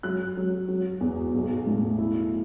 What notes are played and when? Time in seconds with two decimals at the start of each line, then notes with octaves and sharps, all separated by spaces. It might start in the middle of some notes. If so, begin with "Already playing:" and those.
0.03 F#3 F#6
0.37 F#3
0.68 F#3
1.01 E2
1.34 B1
1.66 A2
1.98 E4